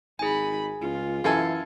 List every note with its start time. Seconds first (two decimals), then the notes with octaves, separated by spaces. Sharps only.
0.19 G#1 D#4 G#4 G#5 B5
0.81 C#2 F4
1.24 F#2 E3 A4 F5 G#5